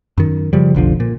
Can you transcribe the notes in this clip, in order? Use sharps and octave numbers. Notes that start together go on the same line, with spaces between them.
F#2 D#3
C#3 F3 G3
F1 B1 D3 F3
A#2